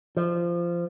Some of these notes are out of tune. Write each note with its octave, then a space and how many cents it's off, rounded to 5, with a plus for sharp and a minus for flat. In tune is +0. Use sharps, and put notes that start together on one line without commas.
F3 -20